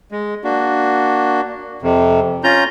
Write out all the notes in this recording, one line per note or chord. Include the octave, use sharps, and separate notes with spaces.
G#3
A#3 D4 F#4
F2 C3
C#4 F4 A#5 G6